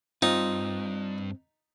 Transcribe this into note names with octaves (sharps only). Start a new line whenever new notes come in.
G2 C4 D#4 F4